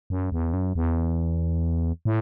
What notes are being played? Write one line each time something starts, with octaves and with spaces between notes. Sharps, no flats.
F#2
E2
F#2
E2
A2